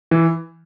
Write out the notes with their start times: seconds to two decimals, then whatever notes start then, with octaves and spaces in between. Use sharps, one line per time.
0.11 E3